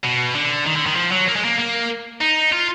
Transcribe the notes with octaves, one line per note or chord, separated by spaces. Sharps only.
B2
D3
D#3
D3
D#3
F3
F#3
A#3
G#3
A#3
A#3
D#4
F4